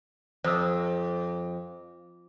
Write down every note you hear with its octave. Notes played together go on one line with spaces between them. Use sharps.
F2 C5 D#6 E6